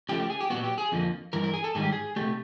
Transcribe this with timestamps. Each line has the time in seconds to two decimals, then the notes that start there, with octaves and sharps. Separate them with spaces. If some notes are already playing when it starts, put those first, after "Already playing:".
0.09 C#3 F3 A3 G4
0.20 G4
0.30 G#4
0.41 G4
0.50 A#2 F#3 B3 F#4
0.64 G4
0.78 G#4
0.92 F2 D3 F3 A#3
1.33 G2 E3 A#4
1.44 A#4
1.54 G#4
1.64 A4
1.75 G#2 D#3 G3 G#4
1.83 G4
1.92 G#4
2.16 C3 E3 A3 G4